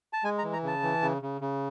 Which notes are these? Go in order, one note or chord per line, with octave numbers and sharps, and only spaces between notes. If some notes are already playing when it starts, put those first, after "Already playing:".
A5
G#3 G#5
A#5
E3
A#5
C#3 A5
E3
C#3
C#3
C#3